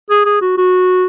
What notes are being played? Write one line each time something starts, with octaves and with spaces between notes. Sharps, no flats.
G#4
G#4
F#4
F#4